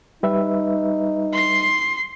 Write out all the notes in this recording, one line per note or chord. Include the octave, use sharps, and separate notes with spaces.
G3 D#4 B4 E5
C6 C7